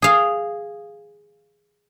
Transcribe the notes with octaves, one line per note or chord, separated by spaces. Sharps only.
G#4 F5